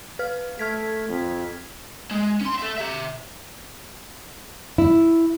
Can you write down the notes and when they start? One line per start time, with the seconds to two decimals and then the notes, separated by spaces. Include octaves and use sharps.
0.19 B4 F6
0.59 A3 F6 G#6 B6
1.09 F2
2.11 G#3
2.41 C#4 C6
2.58 A4 E5
2.78 G4 E5
4.78 E4